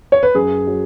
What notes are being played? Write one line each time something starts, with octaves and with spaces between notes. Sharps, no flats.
C#5
B4
F#2 G#4
F#3